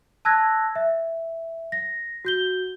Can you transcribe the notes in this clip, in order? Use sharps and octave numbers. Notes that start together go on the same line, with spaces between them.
A5 E6 F#6 G#6 A#6
E5
A#6
F#4 G6 G7